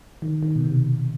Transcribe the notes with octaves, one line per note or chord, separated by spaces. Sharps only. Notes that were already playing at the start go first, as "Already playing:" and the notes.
D#3
D#3
B2
C3